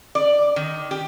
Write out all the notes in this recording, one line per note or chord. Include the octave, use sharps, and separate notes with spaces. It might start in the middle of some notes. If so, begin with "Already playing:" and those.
D5
D#3
G4